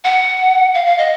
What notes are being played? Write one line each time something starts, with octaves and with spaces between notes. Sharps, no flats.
F#5
F5
F5
D#5